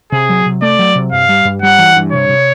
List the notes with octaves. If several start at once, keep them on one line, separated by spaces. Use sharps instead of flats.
C3 G#4
F#3
C3
A3 D5
F#3
C3
G2 F5
G3
G2
G3 F#5
E3
G2
C3 C#5
C3